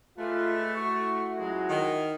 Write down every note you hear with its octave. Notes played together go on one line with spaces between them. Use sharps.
G#3 A3 F4 G4 B4
E4 F#4 C#6
C#2 F#3 G#3
D#3